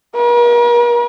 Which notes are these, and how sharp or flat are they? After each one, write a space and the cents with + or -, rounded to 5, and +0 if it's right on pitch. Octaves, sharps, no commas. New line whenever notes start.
A#4 +45